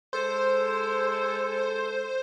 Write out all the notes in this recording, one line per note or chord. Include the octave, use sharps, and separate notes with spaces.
G#3 A4 C5